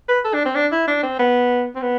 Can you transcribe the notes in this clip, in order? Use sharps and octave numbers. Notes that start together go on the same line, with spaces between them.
B4
A4
D4
C4
D4
E4
D4
C4
B3
C4
B3